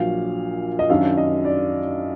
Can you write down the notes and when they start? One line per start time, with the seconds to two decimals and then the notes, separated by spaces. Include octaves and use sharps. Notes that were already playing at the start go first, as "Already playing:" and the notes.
Already playing: A#1 A#2 F#3 F5
0.79 D#5
0.90 F#2 D#3 F#3 D4 F5
1.17 D#5
1.45 D5